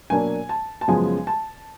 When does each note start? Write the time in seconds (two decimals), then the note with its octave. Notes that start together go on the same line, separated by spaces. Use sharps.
0.10 B2 F#3 A#3 D4 G#5
0.49 A5
0.81 A5
0.88 F#2 C#3 F3 G#3 B3 G#5
1.27 A5